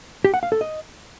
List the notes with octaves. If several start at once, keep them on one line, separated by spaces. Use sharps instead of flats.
G4
F#5
F5
A4
D#5